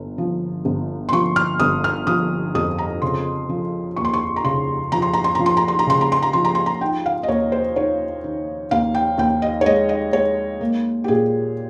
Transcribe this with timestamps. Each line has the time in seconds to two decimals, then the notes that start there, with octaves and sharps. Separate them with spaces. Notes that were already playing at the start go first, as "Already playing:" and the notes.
Already playing: G1
0.18 F3
0.65 G1
1.09 C6
1.12 F3 C#6
1.36 F6
1.60 G1 D#6
1.84 F6
2.07 F3 D#6
2.55 F2 D#6
2.79 A#5
3.02 C#3 C6
3.49 F3
3.97 D#2 C#6
4.05 C6
4.14 C#6
4.36 A#5
4.44 C#3 C6
4.92 F3 A#5
5.02 C6
5.14 A#5
5.24 C6
5.35 F3 A#5
5.46 C6
5.57 A#5
5.68 C6
5.79 A#5
5.87 C#3 C6
6.01 A#5
6.12 C6
6.22 A#5
6.33 F3 C6
6.45 A#5
6.55 C6
6.66 A#5
6.81 D#4 G5
7.06 F5
7.23 D#5
7.28 D#2 C#5
7.52 C5
7.76 D#4 C#5
8.24 D#3
8.71 D#2 F5
8.95 G5
9.18 D#2 G5
9.42 D#5
9.61 C#5
9.66 G#3 D#5
9.89 D#5
10.13 G#3 C#5
10.61 A#3
11.04 G4
11.08 A#2 G#4